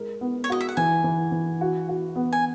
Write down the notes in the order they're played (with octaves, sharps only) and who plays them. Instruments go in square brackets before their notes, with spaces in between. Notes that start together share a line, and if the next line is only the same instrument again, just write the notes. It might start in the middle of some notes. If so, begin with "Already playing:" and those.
Already playing: [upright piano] G#3 A#4
B3
[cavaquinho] C#5
[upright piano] F#4 [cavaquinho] D#5
[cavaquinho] E5
F#5
[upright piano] E3 [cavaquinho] G#5
[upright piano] E3
E3
F#4
F#4
B3
[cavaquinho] G#5